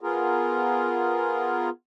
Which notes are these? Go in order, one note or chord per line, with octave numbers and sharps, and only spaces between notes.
B3 F4 G#4 A#4